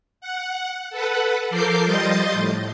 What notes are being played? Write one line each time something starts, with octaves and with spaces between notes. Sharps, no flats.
F#5
A4 B4 F#5
F3 A4 A#4 D6 G6 C7
F3 G3 D#5 C6 G6 A6
A2